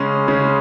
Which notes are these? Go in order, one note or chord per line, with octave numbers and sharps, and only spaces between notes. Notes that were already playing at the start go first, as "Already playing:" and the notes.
Already playing: C#3 G#3 C#4
C#3 G#3 C#4